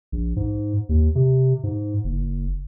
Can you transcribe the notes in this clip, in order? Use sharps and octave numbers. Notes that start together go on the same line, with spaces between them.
A#1
G#2
D#2
C3
G#2
F#1